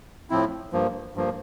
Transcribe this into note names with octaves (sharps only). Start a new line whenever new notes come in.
A2 F3 C4 E4
G2 F3 A#3
G2 F3 A#3